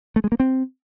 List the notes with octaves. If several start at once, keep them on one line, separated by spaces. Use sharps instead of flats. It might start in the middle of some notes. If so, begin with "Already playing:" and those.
A3
G#3
A#3
C4